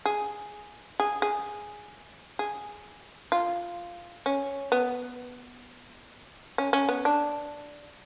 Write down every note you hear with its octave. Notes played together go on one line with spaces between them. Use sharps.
G#4
G#4
G#4
G#4
F4
C#4
B3
C#4
C#4
B3
D4